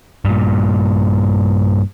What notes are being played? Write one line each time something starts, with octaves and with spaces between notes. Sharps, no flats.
G2 A#2